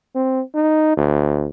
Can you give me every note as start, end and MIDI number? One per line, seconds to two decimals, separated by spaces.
0.15 0.41 60
0.55 0.92 63
0.97 1.48 38